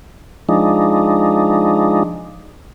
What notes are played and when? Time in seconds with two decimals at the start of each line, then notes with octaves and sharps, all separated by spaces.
0.49 F3 G#3 D4 D#4